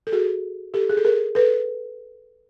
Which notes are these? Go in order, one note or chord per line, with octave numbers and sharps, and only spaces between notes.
A4
F#4 G#4
G4 A4
G#4
A4
G#4 A#4
A4 B4